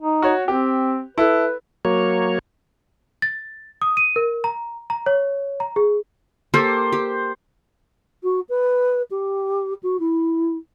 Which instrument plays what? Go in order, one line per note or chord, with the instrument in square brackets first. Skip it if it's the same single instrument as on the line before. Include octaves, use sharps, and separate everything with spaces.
[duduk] D#4
[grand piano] F#4 C#5
[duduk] C4 [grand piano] G4
[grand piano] E4 A4 [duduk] B4
[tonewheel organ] F#3 A#3 C#5
[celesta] A6
D#6
D#7
A#4
A#5
A#5
C#5
A#5
G#4
[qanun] A#3 G4 A4 [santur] C5
[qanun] G4
[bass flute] F#4
B4
G4
F#4
E4